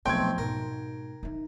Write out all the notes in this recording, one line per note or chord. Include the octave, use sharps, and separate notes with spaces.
B1 A#2 F3 A3 C4 G5 G#6
G#2 B2 A#4
D#4 E4